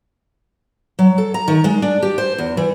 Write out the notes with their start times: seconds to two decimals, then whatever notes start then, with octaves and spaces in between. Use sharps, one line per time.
0.99 F#3
1.18 A4
1.34 A#5
1.48 D#3
1.64 G#3
1.82 D4
2.02 G4
2.18 C5
2.38 E2
2.57 E3